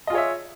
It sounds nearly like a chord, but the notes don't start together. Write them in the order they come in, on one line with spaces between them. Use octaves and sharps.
D#5 F4 G#4 C#5 E5